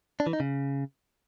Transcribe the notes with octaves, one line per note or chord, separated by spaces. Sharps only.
D4
E3
D#4
C#3